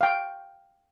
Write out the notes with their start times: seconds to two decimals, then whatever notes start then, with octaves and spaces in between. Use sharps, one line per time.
0.01 F5 G5